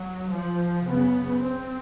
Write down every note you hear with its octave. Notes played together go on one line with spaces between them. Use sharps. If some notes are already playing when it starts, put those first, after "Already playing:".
Already playing: F#3
F3
F#2 C#3 B3
C4